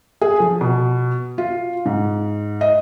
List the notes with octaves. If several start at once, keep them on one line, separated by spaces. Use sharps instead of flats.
G#4
F3
B2
F4
G#2
D#5